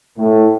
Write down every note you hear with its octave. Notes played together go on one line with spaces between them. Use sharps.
A2